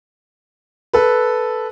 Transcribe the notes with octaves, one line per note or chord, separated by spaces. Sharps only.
A4 B4